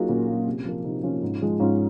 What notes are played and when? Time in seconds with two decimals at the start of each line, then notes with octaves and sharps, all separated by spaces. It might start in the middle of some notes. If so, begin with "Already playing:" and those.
Already playing: F#3 A#3 D#4 F4 F#4 G#4
0.09 A#2 C#4
0.27 F#3 A#3
0.47 C3
0.65 F3 A#3
0.84 C3 C4 D#4
1.03 F3 A#3 C#4 F4
1.22 G#2
1.41 F3 G#3
1.60 G#2 C#4 F4